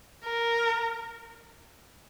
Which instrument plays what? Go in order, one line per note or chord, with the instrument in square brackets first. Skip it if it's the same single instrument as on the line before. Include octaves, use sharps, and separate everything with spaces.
[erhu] A#4